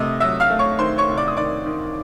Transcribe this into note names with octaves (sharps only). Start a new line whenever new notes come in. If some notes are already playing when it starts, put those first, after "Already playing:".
Already playing: C3 A3 D#5 D#6
F#3 E5 E6
F5 F6
A3
C#5 C#6
D#3 C5 C6
C#5 C#6
C3
D5 D6
D#6
D#3 D5 D6
D#3